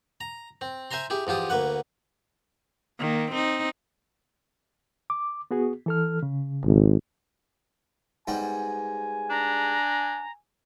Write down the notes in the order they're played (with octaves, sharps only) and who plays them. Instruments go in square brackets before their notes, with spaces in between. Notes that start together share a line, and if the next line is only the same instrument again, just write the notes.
[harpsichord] A#5
C4
C5 E5 G#5 A#5 C6
E4 G4 G#4
E2 F3 F4 G4 D#6
D2 A#3 B4 F#5
[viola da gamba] D#3 A#3
C4 D#4
[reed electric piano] D6
B3 F#4 G#4
E3 A4 F6
C#3
[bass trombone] G#1
[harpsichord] G#2 G3 B3 [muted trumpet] G#5
[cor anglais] D4 [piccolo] A#5